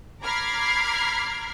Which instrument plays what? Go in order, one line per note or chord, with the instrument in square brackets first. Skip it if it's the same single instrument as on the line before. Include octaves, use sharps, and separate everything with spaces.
[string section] A#5 B5 D6 F6 G#6 C7